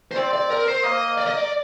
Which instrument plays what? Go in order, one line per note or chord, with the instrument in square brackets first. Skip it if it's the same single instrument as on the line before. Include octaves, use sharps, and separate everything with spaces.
[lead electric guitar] C5
[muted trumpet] C4 [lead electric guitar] D5
[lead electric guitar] D5
A#4
C5
[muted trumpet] A#3 [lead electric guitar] D#5
[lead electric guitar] D5
D#5
D5